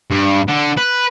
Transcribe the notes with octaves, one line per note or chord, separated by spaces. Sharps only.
G2
D3
B4